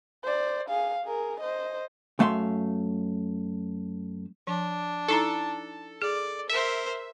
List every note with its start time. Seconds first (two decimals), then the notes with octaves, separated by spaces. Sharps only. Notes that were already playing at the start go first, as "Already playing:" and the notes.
0.23 C5 D5
0.69 G#4 F5
1.04 G#4 A#4
1.40 C5 D#5
2.19 F#2 A3 E5 F5 C6
4.47 F3 D4
5.08 D#4 E4 A4 A#5
6.02 G#4 D5
6.49 A#4 C5 E5